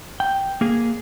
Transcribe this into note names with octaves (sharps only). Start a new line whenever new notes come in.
G5
A#3 G#4